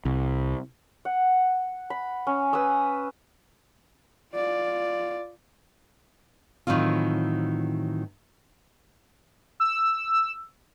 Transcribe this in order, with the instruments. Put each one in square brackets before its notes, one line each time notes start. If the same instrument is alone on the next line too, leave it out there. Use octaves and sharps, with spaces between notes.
[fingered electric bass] C2
[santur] F#5
B5
C#4
B4 G#5 D#6 E6
[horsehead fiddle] F4 D5
[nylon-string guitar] A2 D#3 E3 F#3 C4 F4
[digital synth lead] E6